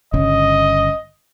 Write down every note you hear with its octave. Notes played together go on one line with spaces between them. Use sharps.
G1 C#3 D#5